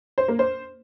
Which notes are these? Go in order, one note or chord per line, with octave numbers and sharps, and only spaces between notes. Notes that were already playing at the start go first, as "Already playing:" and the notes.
C5
A#3
C5